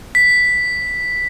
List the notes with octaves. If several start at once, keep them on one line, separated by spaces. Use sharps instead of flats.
B6